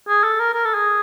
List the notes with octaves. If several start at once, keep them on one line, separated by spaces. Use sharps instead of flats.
G#4
A4
A#4
A#4
A4
G#4